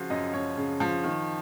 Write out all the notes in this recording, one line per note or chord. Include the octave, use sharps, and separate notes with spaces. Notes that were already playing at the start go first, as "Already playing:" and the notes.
Already playing: C#3 F3 F4 F#4
F#2 D#5
F#2 C#5
C#3
F3
D#3